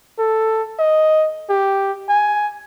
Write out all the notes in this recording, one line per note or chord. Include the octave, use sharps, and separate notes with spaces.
A4
D#5
G4
G#5